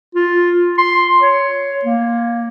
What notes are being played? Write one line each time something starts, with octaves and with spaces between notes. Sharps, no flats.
F4
C6
C#5
A#3